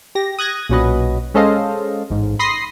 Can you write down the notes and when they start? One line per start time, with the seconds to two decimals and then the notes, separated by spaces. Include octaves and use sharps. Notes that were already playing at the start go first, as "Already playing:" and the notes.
0.15 G4 A#6
0.39 D#6 F#6 G#6 A#6
0.69 B1 A#2 C#4 F#4 B4 D#5
1.34 G#3 C#4 A4 C5 D#5 F5
2.10 A1 G#2
2.39 B5 C6 D#6 A#6 C7